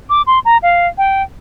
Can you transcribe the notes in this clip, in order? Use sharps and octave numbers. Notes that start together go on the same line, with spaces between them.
D6
C6
A#5
F5
G5